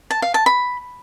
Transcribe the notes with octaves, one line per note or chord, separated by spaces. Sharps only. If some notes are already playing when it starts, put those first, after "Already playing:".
A5
F5
A5
B5